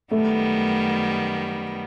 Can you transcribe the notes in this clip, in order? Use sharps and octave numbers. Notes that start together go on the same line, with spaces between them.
F#2 D#3 G3 A3 B3